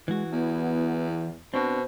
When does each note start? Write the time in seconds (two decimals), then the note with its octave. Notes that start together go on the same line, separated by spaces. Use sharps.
0.08 E3 G#3 F#4
0.32 E2 B3
1.54 B2 C4 D4 C5